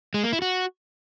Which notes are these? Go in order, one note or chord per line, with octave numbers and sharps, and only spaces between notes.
G#3
A#3
E4
F#4